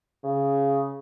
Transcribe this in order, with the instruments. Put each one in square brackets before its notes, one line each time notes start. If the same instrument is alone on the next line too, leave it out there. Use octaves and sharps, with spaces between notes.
[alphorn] C#3